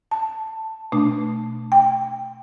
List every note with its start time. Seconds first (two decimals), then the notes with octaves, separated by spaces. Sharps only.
0.11 A5
0.92 B2 A3 D4
1.72 G5